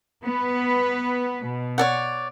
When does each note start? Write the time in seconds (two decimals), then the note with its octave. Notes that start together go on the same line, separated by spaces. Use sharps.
0.23 B3 B4
1.44 B2
1.78 C#5 D5 F#5